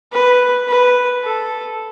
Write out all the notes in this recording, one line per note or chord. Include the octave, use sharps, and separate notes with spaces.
B4
B4
A4